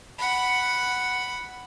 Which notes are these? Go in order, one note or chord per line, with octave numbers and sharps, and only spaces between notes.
F#5 B5